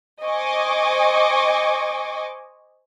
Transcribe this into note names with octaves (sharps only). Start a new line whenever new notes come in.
C5 D#5 G#5 C#6 D6